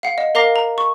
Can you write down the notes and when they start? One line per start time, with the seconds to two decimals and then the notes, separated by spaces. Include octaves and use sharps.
0.03 F5 F#5
0.18 D#5
0.35 A#4 F5 A#5 D6 A#6
0.56 A#5
0.78 C#6